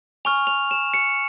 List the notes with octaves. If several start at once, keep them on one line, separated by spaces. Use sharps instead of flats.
G#5 C#6 F6 F7
F7
E7
C#7